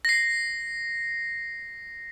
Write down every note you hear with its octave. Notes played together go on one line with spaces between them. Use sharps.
A#6 C7